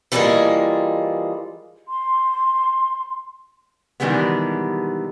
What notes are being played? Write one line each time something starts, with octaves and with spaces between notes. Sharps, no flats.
E3 F3 G3 G#3 A#3 G#4
C6
B2 D#3 E3 G3 G#3 B3